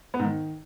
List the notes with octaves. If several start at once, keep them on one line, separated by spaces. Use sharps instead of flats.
B3
G#2
D#3